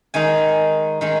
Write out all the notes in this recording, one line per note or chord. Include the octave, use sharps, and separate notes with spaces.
D#3 G#3 D#4 G#5
D#3 G#3 D#4